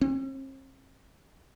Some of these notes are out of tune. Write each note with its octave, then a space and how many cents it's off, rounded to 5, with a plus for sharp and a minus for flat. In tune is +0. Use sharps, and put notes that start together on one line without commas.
C4 +45